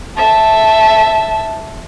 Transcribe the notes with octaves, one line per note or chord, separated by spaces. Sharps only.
E5 A5